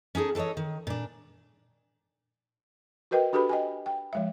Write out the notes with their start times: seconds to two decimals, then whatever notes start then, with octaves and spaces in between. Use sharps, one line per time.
0.15 C#4 D#4 G#4 A4
0.35 E3 A4 B4 C#5 D#5
0.57 D#3
0.87 A#2 D4
3.11 F#4 A#4 B4 D#5 G5
3.33 D4 F#4 G4 A4 B4 B5
3.49 D#5 G5 G#5
3.86 G5
4.13 F3 G#3 E5